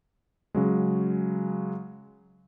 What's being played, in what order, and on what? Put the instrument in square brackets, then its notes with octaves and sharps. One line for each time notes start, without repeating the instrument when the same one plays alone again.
[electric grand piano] C#3 F#3 G#3